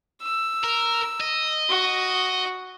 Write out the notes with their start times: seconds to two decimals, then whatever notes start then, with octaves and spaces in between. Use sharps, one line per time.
0.22 E6
0.64 A#4
1.21 D#5
1.69 F#4